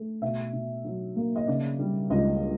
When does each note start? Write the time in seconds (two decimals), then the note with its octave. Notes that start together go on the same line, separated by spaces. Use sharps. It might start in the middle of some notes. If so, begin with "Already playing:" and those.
Already playing: A3
0.22 B2 E5
0.53 B2
0.84 F#3
1.16 A#3
1.36 D#5
1.47 C#3 D5
1.79 G3
2.10 C#2 D#5